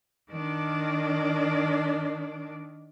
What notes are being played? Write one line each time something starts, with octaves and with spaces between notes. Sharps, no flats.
D#3 D4